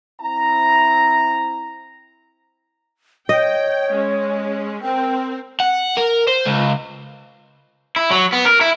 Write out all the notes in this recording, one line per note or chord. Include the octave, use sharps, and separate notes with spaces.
C4 E4 A#5
C#5 D#5 G5
G#3 C#4
C4 A#4 G5
F#5
A#4
C5
C#2
E4
F#3
B3
A#4
E4